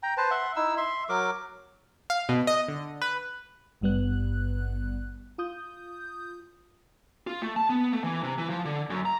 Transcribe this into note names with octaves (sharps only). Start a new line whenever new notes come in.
G5 A#5
B4 C5 A5
E5 F#5 C6
D#4 E4 E6
E5 C6
F#3 A#4 D6
F5
B2
D#5
D3
B4
G#1 G2 G3 B3 F#6
F4 D#6 G6
F4
A3
A5
B3
A3
E3
C3
E3
F3
D3
F#2
A#5